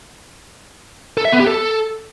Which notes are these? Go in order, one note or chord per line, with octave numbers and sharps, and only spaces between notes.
A4
E5
B3
G4
A4